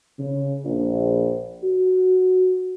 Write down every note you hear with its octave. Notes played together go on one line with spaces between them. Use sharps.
C#3
A#1
F#4